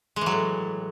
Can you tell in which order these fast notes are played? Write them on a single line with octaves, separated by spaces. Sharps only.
G#3 E3 F#3 A2